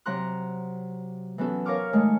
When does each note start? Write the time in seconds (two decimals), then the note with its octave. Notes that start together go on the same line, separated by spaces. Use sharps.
0.06 C3 F#3 F#5 A#5 C6 F#6
1.38 E3 F#3 B3 C#4 F#4 A4
1.65 A#4 C#5 F5 C#6 D6 F6
1.93 D#3 G#3 A3 C#5